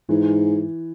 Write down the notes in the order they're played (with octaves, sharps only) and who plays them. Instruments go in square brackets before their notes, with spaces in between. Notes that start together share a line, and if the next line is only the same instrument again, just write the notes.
[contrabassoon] G#2 [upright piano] E3